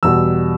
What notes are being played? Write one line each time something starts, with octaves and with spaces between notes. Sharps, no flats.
E2 B2 G3 E6